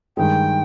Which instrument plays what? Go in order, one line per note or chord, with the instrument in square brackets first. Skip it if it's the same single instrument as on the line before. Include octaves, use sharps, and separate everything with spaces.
[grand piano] G2 D#3 G#3 [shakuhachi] G5